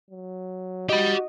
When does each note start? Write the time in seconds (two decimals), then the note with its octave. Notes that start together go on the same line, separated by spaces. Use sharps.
0.10 F#3
0.89 F#4 G4 D#5 B5